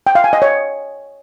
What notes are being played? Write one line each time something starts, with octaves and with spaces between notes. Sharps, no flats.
G5
F5
G#5
D#5
C#5